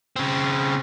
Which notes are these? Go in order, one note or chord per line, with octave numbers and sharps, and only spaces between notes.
C#3 C4